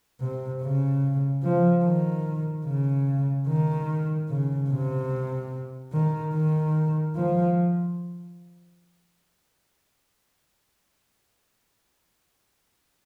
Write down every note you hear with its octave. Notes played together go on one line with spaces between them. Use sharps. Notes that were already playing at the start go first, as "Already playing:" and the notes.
C3
C#3
F3
D#3
C#3
D#3
C#3
C3
D#3
D#3
F3